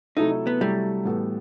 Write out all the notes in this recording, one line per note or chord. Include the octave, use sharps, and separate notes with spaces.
C3 F#3 A3 D#4 E4 A4
B3
C3 F#3 G3 A3 E4 A4
A2 E3 B3 F#4 A4